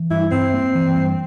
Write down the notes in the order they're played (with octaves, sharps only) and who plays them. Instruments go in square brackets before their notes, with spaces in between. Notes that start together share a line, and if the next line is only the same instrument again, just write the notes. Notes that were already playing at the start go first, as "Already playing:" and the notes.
Already playing: [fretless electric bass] E3
[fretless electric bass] G2 [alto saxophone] E4
[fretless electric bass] G2 [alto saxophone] C4
[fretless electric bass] A#3
E3
G2